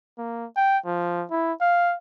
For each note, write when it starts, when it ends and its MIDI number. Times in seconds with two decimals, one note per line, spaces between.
0.18 0.46 58
0.56 0.78 79
0.86 1.25 53
1.31 1.53 64
1.61 1.95 77